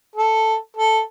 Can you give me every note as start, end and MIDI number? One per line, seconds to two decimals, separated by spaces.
0.16 0.55 69
0.77 1.00 69